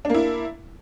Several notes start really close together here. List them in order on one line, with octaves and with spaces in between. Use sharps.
D4 A#3 E4